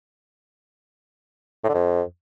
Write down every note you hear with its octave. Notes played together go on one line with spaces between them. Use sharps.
A2
D3
F2